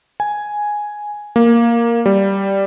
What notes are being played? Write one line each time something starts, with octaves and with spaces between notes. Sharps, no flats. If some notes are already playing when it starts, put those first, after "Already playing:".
G#5
A#3
G3